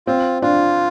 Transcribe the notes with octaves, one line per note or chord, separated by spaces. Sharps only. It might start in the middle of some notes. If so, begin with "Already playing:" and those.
C4 F4
D4 F4